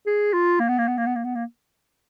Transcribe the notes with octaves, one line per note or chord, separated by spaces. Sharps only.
G#4
F4
A#3
B3
A#3
B3
A#3
B3
A#3
B3
A#3